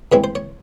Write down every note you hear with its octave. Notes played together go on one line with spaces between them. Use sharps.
G2 E3 G#3 C4 C#5
C5
C#5